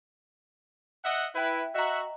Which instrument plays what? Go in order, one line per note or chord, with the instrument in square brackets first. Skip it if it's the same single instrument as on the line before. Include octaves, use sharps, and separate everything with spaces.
[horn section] D#5 E5 F#5
[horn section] E4 B4 [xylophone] E5 G5
[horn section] F#4 E5 [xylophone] D#5 A#5